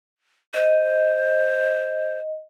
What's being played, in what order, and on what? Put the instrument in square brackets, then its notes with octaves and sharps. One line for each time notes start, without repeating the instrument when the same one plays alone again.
[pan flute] C5 [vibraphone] D#5